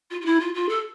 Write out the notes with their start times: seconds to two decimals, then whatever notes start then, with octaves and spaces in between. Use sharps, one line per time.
0.11 F4
0.21 F4
0.25 E4
0.40 F4
0.54 F4
0.69 A4